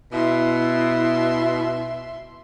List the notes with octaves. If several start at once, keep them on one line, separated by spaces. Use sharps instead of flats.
B2 E4 E5 C6